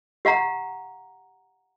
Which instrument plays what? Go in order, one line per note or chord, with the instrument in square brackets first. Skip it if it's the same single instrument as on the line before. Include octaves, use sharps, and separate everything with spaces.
[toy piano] G4 F5 F#5 A#5